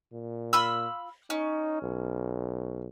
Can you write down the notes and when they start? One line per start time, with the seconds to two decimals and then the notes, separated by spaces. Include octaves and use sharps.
0.12 A#2
0.53 F4 B5 E6
1.30 C#4 D#4
1.82 B1